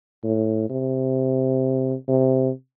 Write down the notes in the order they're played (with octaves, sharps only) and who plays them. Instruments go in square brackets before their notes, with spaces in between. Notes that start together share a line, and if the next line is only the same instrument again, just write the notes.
[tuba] A2
C3
C3